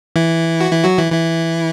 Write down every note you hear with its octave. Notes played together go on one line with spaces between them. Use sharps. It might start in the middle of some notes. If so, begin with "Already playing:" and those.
E3 E4
F#4
E3 E4
F#3 F#4
E3 E4
E3 E4